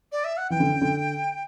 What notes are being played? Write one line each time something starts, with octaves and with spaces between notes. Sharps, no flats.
D5
E5
F#5
E3 G5
D3
C#3
D3